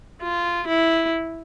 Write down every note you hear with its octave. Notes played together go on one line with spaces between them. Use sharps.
F4
E4